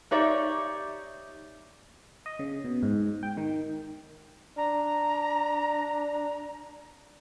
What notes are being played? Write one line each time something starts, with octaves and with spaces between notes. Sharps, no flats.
D#4 G4 C#5 D5 E5
D#5
C#3
B2
G#2
G5
D#3
D4 A#5